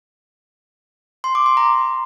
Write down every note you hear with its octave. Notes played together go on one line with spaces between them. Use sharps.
C6
D6
C6
A#5